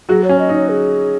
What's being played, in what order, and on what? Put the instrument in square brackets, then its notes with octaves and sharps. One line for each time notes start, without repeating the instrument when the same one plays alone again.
[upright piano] F#3 F#4 [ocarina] G#4
[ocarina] C#5
[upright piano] C#4
[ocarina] D#5
[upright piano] D#4
[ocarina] C#5
G#4